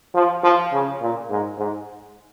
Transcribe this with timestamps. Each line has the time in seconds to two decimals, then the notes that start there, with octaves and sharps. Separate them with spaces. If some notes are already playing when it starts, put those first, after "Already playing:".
0.14 F3
0.43 F3
0.72 C#3
1.01 A#2
1.30 G#2
1.58 G#2